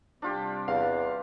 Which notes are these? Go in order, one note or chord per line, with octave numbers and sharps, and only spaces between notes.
C3 G3 D4 F4 G4
E2 F5